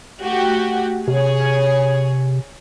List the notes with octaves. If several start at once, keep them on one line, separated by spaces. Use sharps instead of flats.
A3 F#4 G4
C3 G#4 C#5